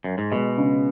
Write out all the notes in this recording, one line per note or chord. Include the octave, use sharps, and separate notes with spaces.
F#2
G#2
B2 G#3
C#3